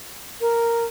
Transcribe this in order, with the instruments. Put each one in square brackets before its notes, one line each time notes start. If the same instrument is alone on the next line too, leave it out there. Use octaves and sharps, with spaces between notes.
[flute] A#4